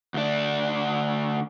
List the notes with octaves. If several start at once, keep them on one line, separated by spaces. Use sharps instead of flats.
D2 D4